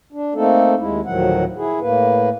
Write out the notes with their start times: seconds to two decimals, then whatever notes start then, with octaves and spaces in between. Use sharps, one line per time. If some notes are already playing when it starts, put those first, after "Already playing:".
0.12 D4
0.35 A3 A#3 C4 D#4 A4
0.79 D#2 G#3 E4
1.06 D2 A2 D#3 F3 F#3 F#5
1.56 E4 G#4
1.81 A2 A#3 B4